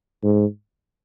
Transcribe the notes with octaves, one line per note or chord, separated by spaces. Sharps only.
G#2